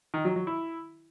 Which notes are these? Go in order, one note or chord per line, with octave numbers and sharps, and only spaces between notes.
D#3
F#3
F#3
E4